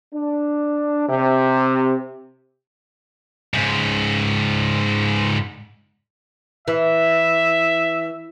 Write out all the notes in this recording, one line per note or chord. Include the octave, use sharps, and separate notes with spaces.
D4
C3
G#2 C#3
E3 E5